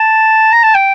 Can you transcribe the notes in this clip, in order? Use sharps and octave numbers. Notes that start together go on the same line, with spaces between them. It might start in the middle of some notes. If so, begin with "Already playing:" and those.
Already playing: A5
A#5
A5
G5